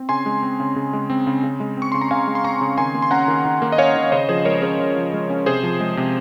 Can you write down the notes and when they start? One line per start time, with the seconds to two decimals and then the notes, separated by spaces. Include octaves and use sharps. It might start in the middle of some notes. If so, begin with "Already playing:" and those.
Already playing: C4
0.09 C#3 G#5 C6
0.26 G#3
0.43 C4
0.60 C#3
0.76 C#3
0.93 G#3
1.10 C4
1.27 C#3
1.44 C#3
1.60 G#3
1.77 C4 C#6
1.92 C#3 C6
2.01 A#5
2.11 C#3 F5 G#5
2.27 G#3
2.35 C6
2.44 C4 A#5 C#6
2.61 C#3
2.78 D#3 G#5 C6
2.94 A#3
3.02 C6
3.11 C#4 F#5 A#5
3.28 D#3
3.45 D#3
3.62 A#3
3.72 D#5
3.78 C#4 C#5 F5
3.95 D#3
4.12 C#3 C5 D#5
4.29 F3 G#4 C5
4.45 G#3 A#4 C#5
4.62 C#4 G#4 C5
4.79 C#3
4.96 F3
5.13 G#3
5.30 C#4
5.46 C3 G#4 C5
5.63 F3
5.80 G#3
5.97 C3